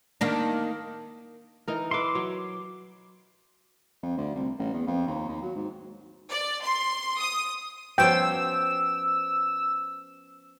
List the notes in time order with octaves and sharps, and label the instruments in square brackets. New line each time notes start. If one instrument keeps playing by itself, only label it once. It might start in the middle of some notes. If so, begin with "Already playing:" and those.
[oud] D#3 A#3 D4
[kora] E3 D#4 A#4
[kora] B4 E5 [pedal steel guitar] C6 D6
[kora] F#3
[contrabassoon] F2
D2
C2
A1
E2
F2
D#2
D#2
F#3
G#2
[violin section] D5
C6
D#6
[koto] F3 B3 C#4 [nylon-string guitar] F#4 C5 [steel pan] G5 [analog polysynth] E6